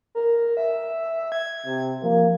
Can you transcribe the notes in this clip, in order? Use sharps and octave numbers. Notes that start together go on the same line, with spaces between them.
A#4
E5
G#6
C3
F3 A#3